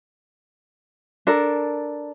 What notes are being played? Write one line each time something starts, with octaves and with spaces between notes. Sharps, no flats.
D4 A4 A#4